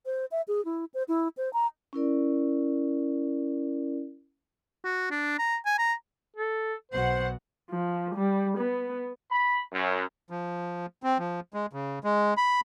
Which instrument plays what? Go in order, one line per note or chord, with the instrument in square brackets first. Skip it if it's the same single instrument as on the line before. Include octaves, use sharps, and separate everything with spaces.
[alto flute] C5
E5
G#4
E4
C5
E4
C5
A#5
[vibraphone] C#4 E4 A#4 D5
[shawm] F#4
D4
A#5
G#5
A#5
[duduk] A4
[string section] B1 B2 F#5 [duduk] C5
[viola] F3
G3
B3
[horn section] B5
F#2
[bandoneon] F3
C4
F3
G#3
C#3
G#3
B5